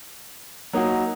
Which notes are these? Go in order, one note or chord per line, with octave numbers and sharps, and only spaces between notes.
F#3 A#3 D#4 F#4